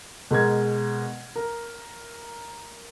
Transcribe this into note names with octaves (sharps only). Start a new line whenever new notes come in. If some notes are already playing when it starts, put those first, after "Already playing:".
B2 G#3 A#4 G#6
A#4